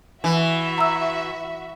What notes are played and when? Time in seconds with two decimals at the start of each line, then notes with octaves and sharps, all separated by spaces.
0.24 E3 F#4 E5
0.78 A#5 E6